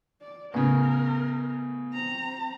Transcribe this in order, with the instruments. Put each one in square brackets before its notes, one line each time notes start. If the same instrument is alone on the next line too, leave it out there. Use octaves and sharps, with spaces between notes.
[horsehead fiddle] D5
[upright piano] A2 C#3 [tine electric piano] B3 [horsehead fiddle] A#4
[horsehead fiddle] C4 A#5